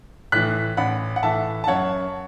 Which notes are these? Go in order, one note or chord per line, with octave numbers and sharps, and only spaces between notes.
A2 E3 F#6 B6
A1 F#5 B5
F#5
A2 E3 E5 A5
A5
F#2 C#5 F#5